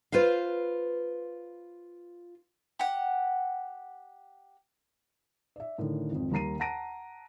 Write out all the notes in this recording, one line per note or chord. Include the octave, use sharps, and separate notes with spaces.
F4 B4 C5 F5
G4 F#5
D5 E5
A2 D3 D#3
G#1 F2
D#2 G3 A#5 C7 D#7
F#5 A5 A#5 A#6 D7 D#7